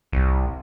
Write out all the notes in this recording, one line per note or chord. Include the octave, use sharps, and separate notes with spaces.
C2